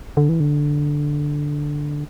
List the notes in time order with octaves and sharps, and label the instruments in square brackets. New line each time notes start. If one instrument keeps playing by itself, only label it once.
[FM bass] D3
E3
D3